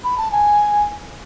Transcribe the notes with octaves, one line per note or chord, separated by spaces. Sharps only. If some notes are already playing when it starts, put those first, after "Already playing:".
B5
A5
G#5